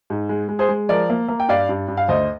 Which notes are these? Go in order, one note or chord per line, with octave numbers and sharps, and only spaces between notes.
G#2
G#3
G#3
G#4 C5
G#3
F3 A#4 D5
A#3
A#3
G5
G2 D5 F5
G2
G2
F5
D2 C5 D#5